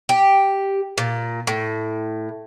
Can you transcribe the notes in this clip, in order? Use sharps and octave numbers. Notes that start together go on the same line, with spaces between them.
G4
A#2
A2